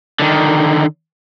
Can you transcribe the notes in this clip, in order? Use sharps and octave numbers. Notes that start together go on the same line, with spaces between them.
D3 D#3